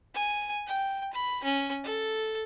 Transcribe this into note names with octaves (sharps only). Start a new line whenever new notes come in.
G#5
G5
B5
C#4
A4